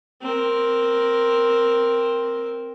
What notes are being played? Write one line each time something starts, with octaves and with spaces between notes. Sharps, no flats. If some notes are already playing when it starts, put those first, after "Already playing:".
C4 A#4